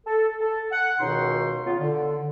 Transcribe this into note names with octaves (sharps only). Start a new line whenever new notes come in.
A4
A4
F#5
C#2 B2 D#3 D#4 C6
C#3 B3 F4
D3